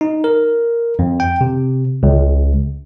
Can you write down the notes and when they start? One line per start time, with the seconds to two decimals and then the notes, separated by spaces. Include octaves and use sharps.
0.01 D#4
0.24 A#4
0.99 F2
1.20 G5
1.41 C3
2.03 C#2